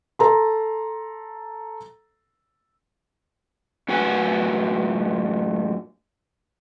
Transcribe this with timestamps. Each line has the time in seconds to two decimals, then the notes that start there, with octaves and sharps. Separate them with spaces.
0.19 A4 A#5 C6
3.88 F#2 A2 F#4 B4 F#5 G#5